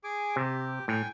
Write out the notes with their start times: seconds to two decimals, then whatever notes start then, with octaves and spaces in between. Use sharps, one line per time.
0.04 G#4 G#5 D6
0.36 C3 G4
0.88 A2 G5 G#5